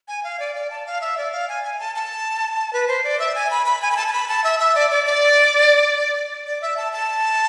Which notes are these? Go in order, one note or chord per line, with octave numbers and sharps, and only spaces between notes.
G#5
F5
D5
D5
A5
F5
E5
D5
F5
G#5
G#5
A5
A5
B4
C5
D5
E5
G#5
B5
B5
G#5
B5
A5
A5
B5
A5
E5
E5
D5
D5
D5
D5
E5
A5
A5